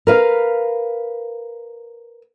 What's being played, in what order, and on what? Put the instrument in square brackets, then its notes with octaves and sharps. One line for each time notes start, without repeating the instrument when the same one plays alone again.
[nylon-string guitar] A#4 B4 F5